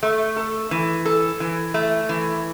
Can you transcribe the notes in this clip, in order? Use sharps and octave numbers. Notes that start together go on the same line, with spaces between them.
A3
A4
E3
A4
E3
A3
E3